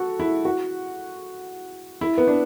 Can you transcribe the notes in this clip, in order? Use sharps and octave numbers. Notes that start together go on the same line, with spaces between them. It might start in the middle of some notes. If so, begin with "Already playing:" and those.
Already playing: F#4 A4
E4
F#4
E4
B3
D4